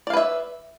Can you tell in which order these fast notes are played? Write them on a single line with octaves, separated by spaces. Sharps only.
D5 F5 B4 E5